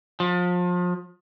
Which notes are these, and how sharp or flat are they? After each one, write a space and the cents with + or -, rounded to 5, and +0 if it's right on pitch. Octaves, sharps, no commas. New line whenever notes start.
F3 +30